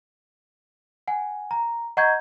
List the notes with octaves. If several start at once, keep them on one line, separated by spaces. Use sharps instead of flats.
F#5 G#5
A#5
D#5 F#5 A#5 C#6 G6 G#6